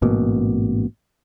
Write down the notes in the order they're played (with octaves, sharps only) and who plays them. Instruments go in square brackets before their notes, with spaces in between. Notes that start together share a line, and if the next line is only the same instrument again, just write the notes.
[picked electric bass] A1 G#2 B2 A#3